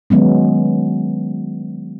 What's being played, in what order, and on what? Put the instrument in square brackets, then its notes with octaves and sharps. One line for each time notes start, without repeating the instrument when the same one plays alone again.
[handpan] D#3 F#3 G#3 B3 C#4